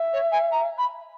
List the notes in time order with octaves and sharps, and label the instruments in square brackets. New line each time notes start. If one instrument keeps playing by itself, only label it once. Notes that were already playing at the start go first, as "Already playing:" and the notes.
Already playing: [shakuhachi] E5
[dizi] C#5
G#5
A#5
B5